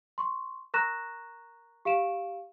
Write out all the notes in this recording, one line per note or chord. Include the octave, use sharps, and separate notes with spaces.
C6 C#6
A#4 A#5 C#6 F#6 A#6 E7
G4 F5 D7 E7